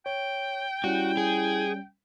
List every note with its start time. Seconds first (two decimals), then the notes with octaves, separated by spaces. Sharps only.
0.06 C#5 G5
0.84 G3 C#4 E4 F#4
1.17 G#4